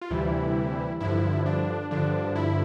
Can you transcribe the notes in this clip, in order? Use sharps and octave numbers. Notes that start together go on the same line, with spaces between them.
F4
D2 C3 E3 G3 E4
G2 D3 F3 E4
D4
G2 D3 F3 D4
E4